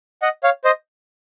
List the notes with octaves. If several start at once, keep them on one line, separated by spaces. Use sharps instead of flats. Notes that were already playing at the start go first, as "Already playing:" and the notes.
D#5 F#5
C#5 F5
C5 D#5